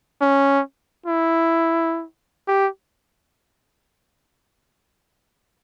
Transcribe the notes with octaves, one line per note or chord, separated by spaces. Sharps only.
C#4
E4
G4